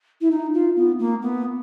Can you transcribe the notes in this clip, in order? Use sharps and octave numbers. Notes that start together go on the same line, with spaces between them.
E4
D#4
F4
B3
A#3
B3